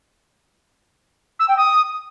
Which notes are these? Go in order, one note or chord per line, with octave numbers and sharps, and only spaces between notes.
E6
G5
D#6